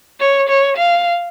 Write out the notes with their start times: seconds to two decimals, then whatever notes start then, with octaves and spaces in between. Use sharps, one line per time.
0.20 C#5
0.49 C#5
0.77 F5